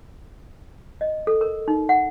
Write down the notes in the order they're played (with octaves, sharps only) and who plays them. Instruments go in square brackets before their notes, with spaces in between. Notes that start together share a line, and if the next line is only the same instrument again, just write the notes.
[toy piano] D#5
A4
A#4
D#4
F#5